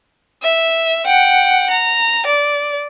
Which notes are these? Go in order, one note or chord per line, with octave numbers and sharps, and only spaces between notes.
E5
F#5 G5
A#5
D5